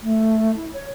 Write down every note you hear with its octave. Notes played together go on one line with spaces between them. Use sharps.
A3
E4
C#5